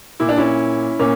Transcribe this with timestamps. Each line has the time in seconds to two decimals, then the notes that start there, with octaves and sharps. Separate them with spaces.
0.20 A#2 E4
0.29 D4
0.37 C#4 E4
0.99 A#2 A#3 C#4